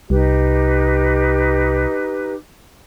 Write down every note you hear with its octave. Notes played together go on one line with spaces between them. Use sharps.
C2 D#4 G4 B4